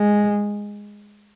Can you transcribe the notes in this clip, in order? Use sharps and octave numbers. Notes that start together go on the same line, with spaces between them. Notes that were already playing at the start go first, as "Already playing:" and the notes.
Already playing: G#3